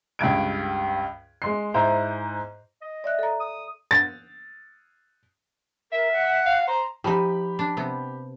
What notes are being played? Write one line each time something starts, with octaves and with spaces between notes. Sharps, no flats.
C#2 G2 G#6 D7
G#3 C6 C7
G#2 E4 C5 A#5
D#5
D5 E5 F#6
A4 A#5
D#6
A6
A#4 E5
F#5
F5
C5 A#5
F3 D#4 G4 B5
D4
C3 B3